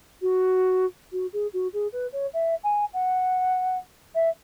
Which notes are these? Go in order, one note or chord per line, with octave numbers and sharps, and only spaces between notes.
F#4
F#4
G#4
F#4
G#4
B4
C#5
E5
G#5
F#5
E5